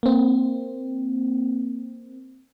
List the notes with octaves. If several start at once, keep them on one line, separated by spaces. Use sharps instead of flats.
A#3 C4